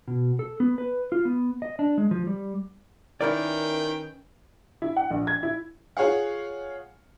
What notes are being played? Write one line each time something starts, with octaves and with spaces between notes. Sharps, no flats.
B2
A4
B3
B4
F4
B3
D#5
D4
G#3
F3
G3
D#3 C#4 E4 A#4 B4 D5 G5
E4
F#5
A#1
G#6
E4
F4 G#4 C#5 F5 F#5